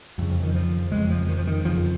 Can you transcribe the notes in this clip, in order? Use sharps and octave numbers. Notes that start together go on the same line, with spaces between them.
F2 C#3 F3
F3
D#3
F3
F2 C#3 G#3
F3
D#3
F3
D#3
F2 C#3 F3